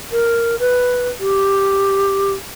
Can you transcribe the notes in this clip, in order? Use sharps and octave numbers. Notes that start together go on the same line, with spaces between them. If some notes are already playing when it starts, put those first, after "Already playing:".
A#4
B4
G4